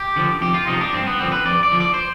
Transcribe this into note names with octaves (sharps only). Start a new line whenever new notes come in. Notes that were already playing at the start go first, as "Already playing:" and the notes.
Already playing: G4
D3 F3
F2 G4
F4
C3 F3 D#4
D4
G2 C4
B3
D3 F3 C4
B4
F2 D5
D5
D3 F3
D5
C5